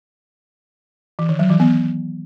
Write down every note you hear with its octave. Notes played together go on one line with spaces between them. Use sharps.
E3
D#3
F#3
E3
B3